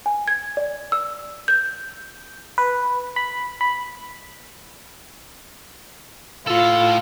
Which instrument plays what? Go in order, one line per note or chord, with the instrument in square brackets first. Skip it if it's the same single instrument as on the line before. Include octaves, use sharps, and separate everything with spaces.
[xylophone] G#5
G#6
D5
E6
G6
[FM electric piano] B4
B5
B5
[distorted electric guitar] A2 A4 [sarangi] F4